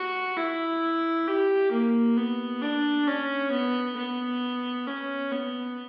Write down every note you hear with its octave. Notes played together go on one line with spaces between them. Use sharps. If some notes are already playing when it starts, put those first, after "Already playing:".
Already playing: F#4
E4
G4
A#3
B3
D4
C#4
B3
B3
C#4
B3